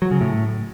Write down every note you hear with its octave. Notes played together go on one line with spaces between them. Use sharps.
F#3
C#3
A2